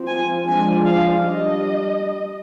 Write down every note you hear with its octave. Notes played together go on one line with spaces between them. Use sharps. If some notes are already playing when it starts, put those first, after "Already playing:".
Already playing: F3 C4
G#5
F3 G#3 D4 G#5
F5
G3 D4 D#5